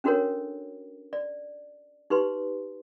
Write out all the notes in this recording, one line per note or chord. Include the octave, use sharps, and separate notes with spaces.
C#4 D4 F#4 A4 A#4 C#5
D5
D#4 G4 B4 C6